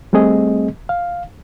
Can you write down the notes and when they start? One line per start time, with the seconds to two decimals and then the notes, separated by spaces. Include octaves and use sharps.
0.13 G3 A3 C4 G#4 D#5
0.89 F5